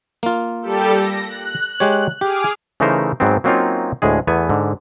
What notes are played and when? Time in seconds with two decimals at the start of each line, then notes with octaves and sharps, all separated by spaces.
0.23 A#3 F4
0.62 G3 G4 A4
0.94 A#6
1.27 F#6
1.80 G#3 G4 C#5
2.21 G4 G#4 D6 F6
2.80 C#3 E3 A3 D#4 A#4 C5
3.20 G#2 F#3 B3 C4
3.44 F#3 A#3 C4 C#4 D#4 F4
4.02 D2 A2 G#3 G#4
4.27 E2 A3 B3 G#5
4.49 G#2 D3